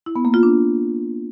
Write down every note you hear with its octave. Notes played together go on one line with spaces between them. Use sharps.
E4
B3
A#3
F4
D4